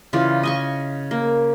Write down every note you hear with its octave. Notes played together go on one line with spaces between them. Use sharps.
C#3 E3 F4 D5
D#5 G#5 C#6
A#3